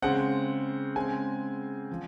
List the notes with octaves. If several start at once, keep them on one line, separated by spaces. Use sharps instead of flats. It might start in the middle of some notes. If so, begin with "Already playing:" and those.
C#3 G#3 C4 F#5
C#3 G#3 C4 G#5
F3